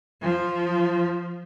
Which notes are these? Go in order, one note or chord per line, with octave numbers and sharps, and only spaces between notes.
F3